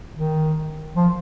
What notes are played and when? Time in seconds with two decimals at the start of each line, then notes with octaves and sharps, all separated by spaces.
0.14 D#3
0.96 F3